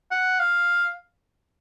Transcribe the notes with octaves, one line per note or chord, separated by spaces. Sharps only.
F#5
F5